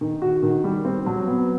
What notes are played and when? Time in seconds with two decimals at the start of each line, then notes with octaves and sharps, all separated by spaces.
0.01 D#3
0.22 F#4
0.43 D#3
0.64 G3
0.85 C4
1.06 F#3
1.27 B3